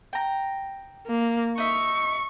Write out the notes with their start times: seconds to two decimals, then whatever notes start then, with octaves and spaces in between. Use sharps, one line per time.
0.13 G5 A#5
1.08 A#3
1.58 D#4 E5 C#6